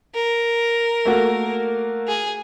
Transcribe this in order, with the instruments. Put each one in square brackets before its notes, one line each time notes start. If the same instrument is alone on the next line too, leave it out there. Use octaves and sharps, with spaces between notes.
[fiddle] A#4
[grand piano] A3 A#3 F#4
[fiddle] G#4